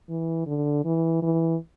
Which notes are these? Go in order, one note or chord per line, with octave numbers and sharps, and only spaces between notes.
E3
D3
E3
E3